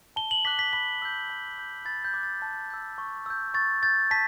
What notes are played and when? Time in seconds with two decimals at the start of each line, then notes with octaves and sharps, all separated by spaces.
0.16 A5 G7
0.31 F#7
0.45 D6 F#6 B6
0.59 B6
0.73 B5 B6
1.02 E6 G6
1.30 A5
1.58 D6 G6
1.85 B5 A6
2.05 G6
2.14 D6 F#6
2.23 A6
2.42 A5
2.70 E6 G6
2.98 C#6
3.26 E6 G6
3.54 C#6 A6
3.83 G6 A6
4.11 A5 B6